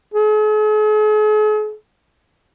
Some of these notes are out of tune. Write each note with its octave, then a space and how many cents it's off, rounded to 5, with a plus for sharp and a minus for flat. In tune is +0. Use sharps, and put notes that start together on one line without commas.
G#4 +45